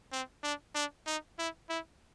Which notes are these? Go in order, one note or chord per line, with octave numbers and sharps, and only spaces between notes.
C4
D4
D4
D#4
E4
E4